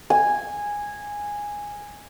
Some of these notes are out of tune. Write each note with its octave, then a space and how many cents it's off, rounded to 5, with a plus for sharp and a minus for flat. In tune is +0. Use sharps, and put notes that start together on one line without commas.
G#5 -10